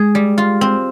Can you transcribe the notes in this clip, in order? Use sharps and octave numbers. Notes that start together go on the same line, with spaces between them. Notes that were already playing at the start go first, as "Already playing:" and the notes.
Already playing: G#3 G#4
G3
F4
C4